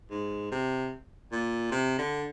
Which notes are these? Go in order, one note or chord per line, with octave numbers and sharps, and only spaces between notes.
G#2
C3
A#2
C3
D3